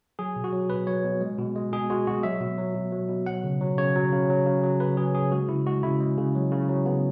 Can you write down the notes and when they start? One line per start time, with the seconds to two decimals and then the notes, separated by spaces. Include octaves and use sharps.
0.19 F#3 G#4
0.36 B2
0.44 F#4
0.52 F#3
0.70 B2 B4
0.87 F#3 C#5
1.05 B2
1.21 G#3
1.38 B2
1.55 G#3
1.72 B2 G#4
1.90 G#3 F#4
2.07 B2 F#4
2.23 F#3 E5
2.41 B2
2.58 F#3
2.75 B2
2.92 F#3
3.09 B2
3.26 F#3 F#5
3.44 C#3
3.61 F#3
3.78 C#3 C#5
3.95 F#3
4.12 C#3
4.30 F#3
4.46 C#3
4.63 F#3
4.80 C#3 B4
4.97 F#3 G#4
5.14 C#3 G#4
5.32 G#3 F#4
5.49 C#3 E4
5.66 G#3 F#4
5.83 C#3 E4
6.00 G#3
6.17 C#3
6.35 F#3
6.52 C#3
6.69 F#3
6.85 C#3 B3